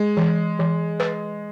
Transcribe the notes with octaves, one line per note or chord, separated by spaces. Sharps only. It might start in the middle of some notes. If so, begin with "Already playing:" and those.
Already playing: G#3
E3
E3
B4